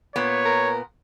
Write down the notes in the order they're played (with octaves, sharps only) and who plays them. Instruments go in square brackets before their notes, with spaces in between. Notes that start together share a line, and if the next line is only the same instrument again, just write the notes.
[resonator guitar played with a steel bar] A#2 B3 [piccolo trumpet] C#5
[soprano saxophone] A#4